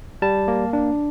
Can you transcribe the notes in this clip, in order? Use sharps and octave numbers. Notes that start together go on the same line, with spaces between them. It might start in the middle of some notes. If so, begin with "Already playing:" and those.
G3 A5
A#3
D4